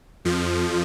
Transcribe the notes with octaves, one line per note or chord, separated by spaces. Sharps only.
F2 F3